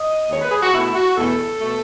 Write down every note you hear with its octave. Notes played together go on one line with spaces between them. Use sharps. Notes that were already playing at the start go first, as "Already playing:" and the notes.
Already playing: D#5
D#2 D#3 G#3 C#5
B4
G#4
F#4
B2 A3 E4
F#4
E2 B2 A3 A4
B2 A3